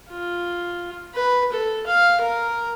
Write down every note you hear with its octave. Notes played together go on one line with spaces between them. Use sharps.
F4
B4
A4
F5
A#4